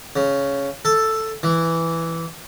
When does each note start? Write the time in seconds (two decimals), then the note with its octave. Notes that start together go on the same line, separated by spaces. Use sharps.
0.16 C#3
0.85 A4
1.43 E3